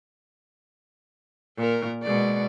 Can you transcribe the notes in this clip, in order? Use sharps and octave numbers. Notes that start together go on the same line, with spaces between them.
A#2 A#4
B2 G#3 D5